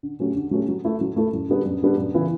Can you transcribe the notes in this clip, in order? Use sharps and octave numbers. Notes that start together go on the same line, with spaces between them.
D3
F#3 A3 C#4 G4
D3
F#3 A3 C#4 G4
F#3
A3 E4 A4
F#3
A3 E4 A4
F#2
D3 G3 B3 D4
F#2
D3 G3 B3 D4
F#2
C#3 E3 B3 E4